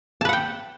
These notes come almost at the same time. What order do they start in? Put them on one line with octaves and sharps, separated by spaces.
A5 B4 F#5 G5